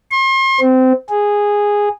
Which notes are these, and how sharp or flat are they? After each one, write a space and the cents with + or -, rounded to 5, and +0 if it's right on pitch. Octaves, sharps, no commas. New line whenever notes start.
C6 +40
C4 -20
G#4 -10